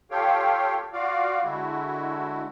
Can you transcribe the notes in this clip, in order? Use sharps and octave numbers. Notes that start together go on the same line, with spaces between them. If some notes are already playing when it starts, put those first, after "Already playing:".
F4 G4 A4 C#5 F5 G5
F4 F#4 D5 F5
D3 G#3 E4 F#4